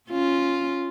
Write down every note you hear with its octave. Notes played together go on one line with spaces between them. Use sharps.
C#4 F4